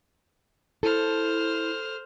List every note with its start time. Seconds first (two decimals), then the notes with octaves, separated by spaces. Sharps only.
0.83 E4 A4 C5 F6